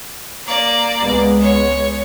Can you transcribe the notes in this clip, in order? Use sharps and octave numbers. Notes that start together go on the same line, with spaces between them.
A#3 D5
C#2 G#3 B3
C#5